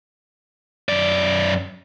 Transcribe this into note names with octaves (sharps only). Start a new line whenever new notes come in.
F#2 D5